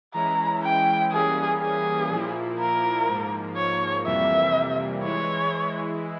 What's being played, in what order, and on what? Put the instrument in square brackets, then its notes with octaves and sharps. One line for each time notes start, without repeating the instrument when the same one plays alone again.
[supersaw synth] E3 G#3 C#4 E4 [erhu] A#5
[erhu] G5
[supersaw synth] E3 G3 A#3 C#4 [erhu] G#4
[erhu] G#4
[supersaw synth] A#2 F3 A#3 E4
[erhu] A#4
[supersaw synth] G#2 F3 A#3
[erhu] C#5
[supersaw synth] F2 C3 E3 G3 A#3 [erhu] E5
[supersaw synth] E3 G#3 E4 [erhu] C#5